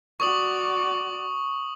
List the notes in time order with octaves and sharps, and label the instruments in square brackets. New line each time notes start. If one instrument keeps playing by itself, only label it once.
[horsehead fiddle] F#4 D5 [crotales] C#6 D#6 F#7